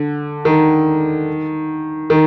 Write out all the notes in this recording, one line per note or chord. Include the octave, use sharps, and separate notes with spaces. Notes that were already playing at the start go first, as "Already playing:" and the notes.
Already playing: D3
D#3
D#3